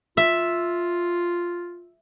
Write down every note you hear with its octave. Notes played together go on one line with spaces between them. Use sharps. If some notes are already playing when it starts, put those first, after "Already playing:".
F4 E5